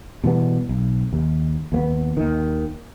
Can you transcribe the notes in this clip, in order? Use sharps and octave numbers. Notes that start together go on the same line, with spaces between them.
B2 E3 G3 B3
B1
D#2
D#2 A#3 B3
D#2 D#3